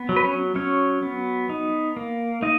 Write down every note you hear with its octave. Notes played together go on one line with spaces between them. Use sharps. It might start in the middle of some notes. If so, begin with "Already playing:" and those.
Already playing: B3
F#3
B4
C#4 C#5
F#3 C#4 C#5
B3
D#4
A#3
A#3 D#4 D#5